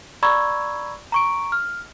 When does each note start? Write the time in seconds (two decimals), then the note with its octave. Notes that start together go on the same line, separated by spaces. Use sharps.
0.23 D5 A#5 B5 C#6 E6 G#6
1.12 A#5 C#6 D7
1.52 F6